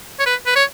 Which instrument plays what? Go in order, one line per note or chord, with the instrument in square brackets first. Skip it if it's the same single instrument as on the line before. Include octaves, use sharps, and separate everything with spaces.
[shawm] C#5
B4
B4
C#5